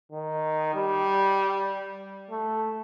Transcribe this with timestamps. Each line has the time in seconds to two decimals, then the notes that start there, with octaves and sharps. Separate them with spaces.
0.12 D#3
0.75 G3
2.31 A3